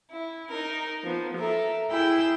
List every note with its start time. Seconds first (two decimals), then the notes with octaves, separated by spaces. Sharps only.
0.11 E4
0.49 D#4 A#4
1.04 F3 B3
1.37 A4 A#4 E5
1.91 E4 G#4 G5 E6 G6